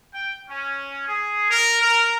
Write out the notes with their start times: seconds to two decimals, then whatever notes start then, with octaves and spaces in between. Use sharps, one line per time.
0.12 G5
0.48 C#4
1.07 G#4
1.48 A#4
1.81 A#4